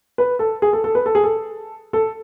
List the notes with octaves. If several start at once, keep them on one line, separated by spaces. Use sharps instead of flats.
B4
A4
G#4
A4
A4
B4
A4
G#4
A4
A4